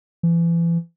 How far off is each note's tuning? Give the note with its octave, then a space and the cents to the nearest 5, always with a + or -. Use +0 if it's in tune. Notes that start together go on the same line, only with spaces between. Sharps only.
E3 +35